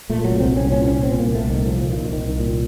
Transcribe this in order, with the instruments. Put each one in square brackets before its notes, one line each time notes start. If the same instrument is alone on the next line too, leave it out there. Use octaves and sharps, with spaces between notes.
[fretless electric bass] A#2 A3
F#3
C2
C4
C2
C#4
A#2 C#4
C#4
A#2
C4
C2
A#3
C2 A3
D#3
A#2
F3
A#2 F3
F3
C2 D#3
C2 D#3
D#3
A#2